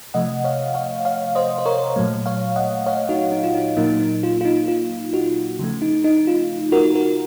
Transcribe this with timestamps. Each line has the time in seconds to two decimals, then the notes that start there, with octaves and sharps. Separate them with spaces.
0.14 C3 F3 A3 D#5 F#5
0.44 C#5 F5
0.74 C#5 F5
1.05 C#5 F5
1.35 C5 D#5
1.58 C5
1.66 A#4 C#5
1.96 A#2 F#3 A3
2.26 C#5 F5
2.56 D#5 F#5
2.86 C#5 F5
3.09 D#4 F#4
3.32 D#4
3.44 F4
3.55 D#4
3.77 A#2 F#3 A#3 D#4
4.00 D#4
4.23 F4
4.41 F4
4.45 D#4
4.68 F4
5.13 D#4 F#4
5.59 C#3 F3 A3
5.82 D#4
6.04 D#4
6.27 F4
6.72 F#4 A#4
6.95 F#4 A#4